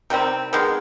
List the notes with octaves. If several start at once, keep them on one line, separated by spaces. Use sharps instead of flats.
C3 D#3 G3 C4
D#3 G#3 B3